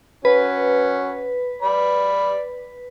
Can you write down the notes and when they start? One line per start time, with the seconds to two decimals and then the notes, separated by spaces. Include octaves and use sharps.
0.25 C#4 F#4 B4
1.62 D5 B5